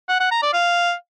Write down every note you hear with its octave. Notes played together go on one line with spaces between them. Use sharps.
F#5
F#5
A#5
D5
F5